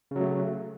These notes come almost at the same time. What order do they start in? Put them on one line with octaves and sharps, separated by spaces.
C#3 F#3 A3